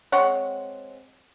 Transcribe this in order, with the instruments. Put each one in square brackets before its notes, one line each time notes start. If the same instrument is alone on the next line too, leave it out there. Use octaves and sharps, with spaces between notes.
[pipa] G#3 C4 C#5 F#5